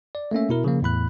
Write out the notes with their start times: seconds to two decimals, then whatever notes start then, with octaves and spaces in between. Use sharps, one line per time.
0.15 D5
0.31 A3 A#3 C#4 E5
0.49 B2 E4 A#4
0.64 C#3 F3 A#3
0.82 E2 A2 B5 F#6